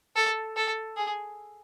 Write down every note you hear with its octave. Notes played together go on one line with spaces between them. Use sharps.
A4
A4
G#4